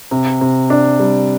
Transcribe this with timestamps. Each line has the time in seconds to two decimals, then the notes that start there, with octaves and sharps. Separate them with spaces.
0.11 C3
0.41 C3
0.70 D4
1.00 G3